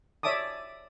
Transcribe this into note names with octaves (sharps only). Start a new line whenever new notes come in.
C#5 D5 E5 A5 D6 D#6